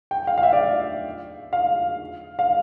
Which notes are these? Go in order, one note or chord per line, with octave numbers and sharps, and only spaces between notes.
G5
F5
F5
E5
D5
E5
F5
F5